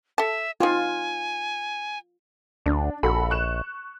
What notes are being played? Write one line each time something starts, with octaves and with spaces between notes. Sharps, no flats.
A4 E5 A5
C4 D#4 F4 G#5
D2 D4
A#1 F#4 A4 B5
C#6 F#6 E7